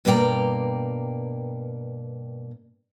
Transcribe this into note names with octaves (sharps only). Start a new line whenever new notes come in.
G2 B2 A#3 D5 G5 A#5